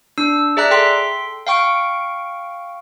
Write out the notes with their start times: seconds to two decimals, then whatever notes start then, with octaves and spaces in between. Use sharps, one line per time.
0.18 D4 E6
0.57 G#4 D5 E5 A#5 F#6
0.71 A4 G5 C6 B6
1.47 F5 G5 C#6 D7